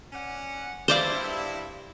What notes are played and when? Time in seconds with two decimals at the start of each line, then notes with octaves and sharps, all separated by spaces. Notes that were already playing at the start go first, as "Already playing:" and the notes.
0.13 C#4 D5 F#5
0.88 G2 E4 C5 D5 F5